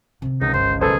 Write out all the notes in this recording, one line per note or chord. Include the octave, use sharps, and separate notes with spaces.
C3 D#3
C#2 D#4
G1 C5
B1 G#4 A4 B4 C5